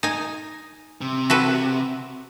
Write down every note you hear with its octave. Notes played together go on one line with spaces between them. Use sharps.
D#4 G#5
C3
F#4 A4 B4